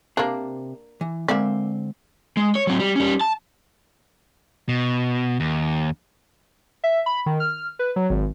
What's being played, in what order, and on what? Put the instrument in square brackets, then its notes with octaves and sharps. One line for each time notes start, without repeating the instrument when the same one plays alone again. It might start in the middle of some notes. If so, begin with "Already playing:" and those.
[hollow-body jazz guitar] C3 C5 [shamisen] A#3 D4
[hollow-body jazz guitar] E3
[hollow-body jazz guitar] D3 C4 E5 [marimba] G#3 [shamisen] A#3 D5
[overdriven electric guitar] G#3
C#5
F#3 C4
G3
G3 C#4
A5
[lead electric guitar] B2
D#2
[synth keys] E5
B5
D#3
F6
B4
F#3
G#1